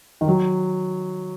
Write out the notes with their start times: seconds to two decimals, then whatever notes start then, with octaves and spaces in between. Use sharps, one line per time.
0.21 D#3
0.28 F#3